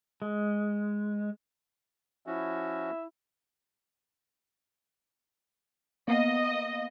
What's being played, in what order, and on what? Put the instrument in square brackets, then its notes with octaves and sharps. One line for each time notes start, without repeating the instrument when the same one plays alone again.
[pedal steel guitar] G#3
[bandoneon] F3 C#4 F#4 [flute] E4 [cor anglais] E5
[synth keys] A#3 B3 F5 [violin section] D#5